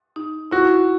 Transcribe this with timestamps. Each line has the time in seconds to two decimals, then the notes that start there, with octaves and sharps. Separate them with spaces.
0.16 D#4
0.51 E4 F#4